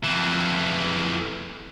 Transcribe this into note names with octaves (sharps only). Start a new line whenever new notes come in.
F2 E3